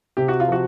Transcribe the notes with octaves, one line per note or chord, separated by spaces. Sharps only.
C3 G4
F#4
F4
F3 F#4